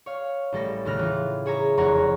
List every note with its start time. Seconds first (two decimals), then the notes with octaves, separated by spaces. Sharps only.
0.06 C#5 F5
0.52 A1 G3 A4 A#6
0.85 D#2 A2 C#3 F6 F#6 A#6
0.99 E3 F4
1.46 G#4 C#5 E5 A#5
1.78 F1 E2 A#4 C#5 F#5 A#5